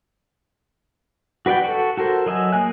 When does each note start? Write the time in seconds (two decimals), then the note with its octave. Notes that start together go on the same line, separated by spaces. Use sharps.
1.46 F#4 B4 D5 F#5 G5
1.64 F#4 A4
1.97 F#4 A4 A#4 C5
2.26 F#3 D#5 E5 G#5
2.52 A#3 G#4 G#5 F#6